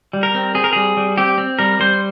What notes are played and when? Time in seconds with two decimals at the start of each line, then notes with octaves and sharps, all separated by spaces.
0.13 G3
0.23 A#4
0.34 C4
0.55 C4 G#4
0.64 A#4
0.73 G3 G#4
0.97 G3
1.18 C4 G4
1.38 C4
1.59 G3 A#4
1.79 G3 C5